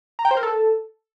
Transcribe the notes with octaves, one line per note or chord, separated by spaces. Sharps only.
A#5
G5
C5
A#4
A4